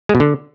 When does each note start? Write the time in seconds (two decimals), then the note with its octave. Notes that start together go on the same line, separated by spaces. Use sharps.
0.09 G#3
0.15 B2
0.20 D3